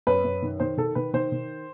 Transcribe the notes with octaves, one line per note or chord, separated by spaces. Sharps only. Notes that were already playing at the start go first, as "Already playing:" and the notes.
F#2 B4
F#2
D#3
D#3 C5
D#3 A4
D#3 B4
D#3 C5
D#3